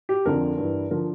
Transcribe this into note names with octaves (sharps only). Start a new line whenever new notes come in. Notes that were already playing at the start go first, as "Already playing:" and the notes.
G4
F2 D3 F3 A#4
G2 E3
D3 F3 A#4